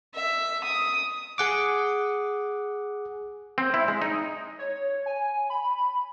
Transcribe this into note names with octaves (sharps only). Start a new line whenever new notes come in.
E5
D#6
G#4 F#5 D6
C4
E4
G#3
D#4
C#5
G#5
B5